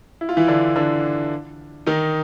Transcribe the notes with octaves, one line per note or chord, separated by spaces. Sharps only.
E4
F4
E3 E4
D3 D4
D3 D4
D#3 D#4